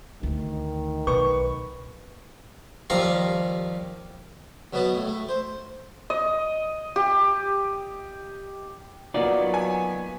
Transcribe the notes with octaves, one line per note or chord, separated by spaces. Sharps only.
D2 D#3
B1 B4 C#6
D#2 F3 G3 F5 A#5
B2 F#3 B3 B4 D#5 A5
A2
A3
C5
D#5
G4
F#3 A#3 B3 D#4 F4 F#4 D5
G#5